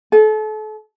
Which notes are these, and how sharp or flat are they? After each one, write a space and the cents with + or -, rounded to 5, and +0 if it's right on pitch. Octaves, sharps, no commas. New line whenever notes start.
A4 -35